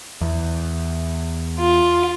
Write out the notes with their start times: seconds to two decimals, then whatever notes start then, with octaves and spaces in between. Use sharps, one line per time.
0.21 E2
1.59 F4